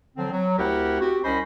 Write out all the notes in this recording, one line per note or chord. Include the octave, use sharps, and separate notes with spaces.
D3 F3 F#3 C4
F#3
D2 C4 E4 G4 A#4 F#5
C4 F#4 G4
C2 C#4 C5 D#5 B5